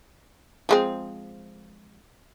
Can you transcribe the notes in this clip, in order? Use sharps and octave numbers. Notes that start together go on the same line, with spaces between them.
F3 G#3 C4